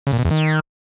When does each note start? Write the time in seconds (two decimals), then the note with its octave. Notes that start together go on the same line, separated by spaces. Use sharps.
0.07 C#3
0.13 A#2
0.19 B2
0.25 E2
0.31 D#3